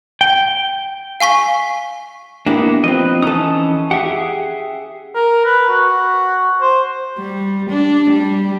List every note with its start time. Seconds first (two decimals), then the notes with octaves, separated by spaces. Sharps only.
0.21 G5
1.20 F5 G#5 C#6 B6
2.46 A#3 B3 D4 E4 G4
2.84 F3 C4 B4 D#5
3.22 E3 C#4 D#4 A4 D#6
3.91 G4 G#4 E5 F#5
5.15 A#4
5.45 B4
5.69 F#4
6.61 C5
7.18 G3
7.69 D4
8.10 G3